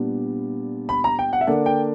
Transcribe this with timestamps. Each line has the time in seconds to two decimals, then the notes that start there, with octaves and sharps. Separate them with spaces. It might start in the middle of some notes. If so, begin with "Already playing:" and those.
Already playing: A#2 G3 B3 D4
0.89 B5
1.04 A#5
1.19 G5
1.33 F#5
1.41 E5
1.47 D3 A#3 D4 F#5
1.66 G5